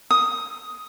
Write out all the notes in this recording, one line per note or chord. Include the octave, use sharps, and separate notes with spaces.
D#6